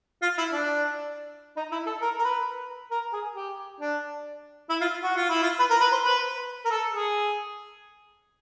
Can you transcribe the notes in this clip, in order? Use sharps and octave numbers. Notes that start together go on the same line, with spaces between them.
F4
E4
D4
D#4
E4
A4
A#4
A#4
B4
A#4
G#4
G4
D4
E4
F4
F#4
F4
E4
F4
B4
A#4
B4
C5
B4
A#4
A4
G#4